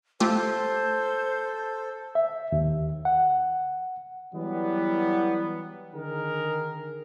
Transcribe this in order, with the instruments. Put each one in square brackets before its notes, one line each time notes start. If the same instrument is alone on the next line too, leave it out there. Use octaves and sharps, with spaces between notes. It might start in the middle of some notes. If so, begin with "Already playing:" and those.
[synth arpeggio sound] A3 F4 G4 [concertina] A4 [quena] C5
[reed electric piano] E5
D#2
F#5
[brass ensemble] E3 F#3 G3 B3
D3 D#3 G#4 A#4